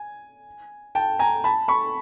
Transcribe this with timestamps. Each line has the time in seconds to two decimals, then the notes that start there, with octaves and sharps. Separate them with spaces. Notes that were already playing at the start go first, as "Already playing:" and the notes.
Already playing: G#5
0.95 G5 A5
1.19 G#5 A#5
1.44 A5 B5
1.68 B5 C#6